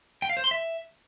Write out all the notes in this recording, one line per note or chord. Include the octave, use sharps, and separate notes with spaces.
G5
F5
C5
C6
E5